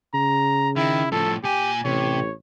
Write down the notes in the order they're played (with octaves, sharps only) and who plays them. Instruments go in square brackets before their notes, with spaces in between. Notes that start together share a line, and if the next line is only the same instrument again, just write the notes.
[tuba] C#3 [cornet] A#5
[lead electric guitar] D#3 [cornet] E4
[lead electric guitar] A2 F3 [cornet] A4
[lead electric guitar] A#2 G#5 [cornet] G4
[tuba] A1 [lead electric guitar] C3 [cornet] C#5